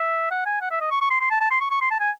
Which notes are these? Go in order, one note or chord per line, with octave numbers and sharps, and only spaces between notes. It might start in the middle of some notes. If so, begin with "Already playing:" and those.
Already playing: E5
F#5
G#5
F#5
E5
D#5
C#6
C#6
C6
C6
A5
A5
C6
C#6
C#6
C6
A5
G#5